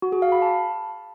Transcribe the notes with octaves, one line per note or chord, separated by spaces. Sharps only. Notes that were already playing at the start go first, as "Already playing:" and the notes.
F#4
G#4
F5
B5
A5